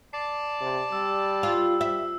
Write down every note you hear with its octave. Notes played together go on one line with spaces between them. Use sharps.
D5 A5 C7
C3
G3 E6
F4 E6
E5